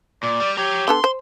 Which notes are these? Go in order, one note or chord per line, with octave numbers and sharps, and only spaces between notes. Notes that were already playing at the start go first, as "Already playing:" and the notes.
A#2 D5
G3
G4 C#5 A#5
D3 B3 A4 C6
C5